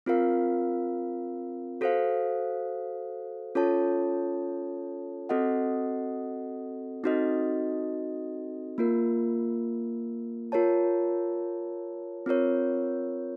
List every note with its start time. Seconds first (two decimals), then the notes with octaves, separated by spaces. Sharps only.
0.06 C4 F4 A#4 F5
1.81 F#4 A4 C5 F5
3.55 C#4 F4 A4 C#5 A5
5.29 C4 F#4 A4 D#5 F#5
7.04 C4 D#4 F#4 A4 D#5
8.78 A#3 F4 A#4
10.52 F4 A#4 C#5 A5
12.26 C4 F4 A#4 C#5